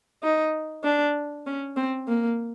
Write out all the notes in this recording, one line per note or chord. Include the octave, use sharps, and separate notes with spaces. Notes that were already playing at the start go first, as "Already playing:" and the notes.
D#4
D4
C#4
C4
A#3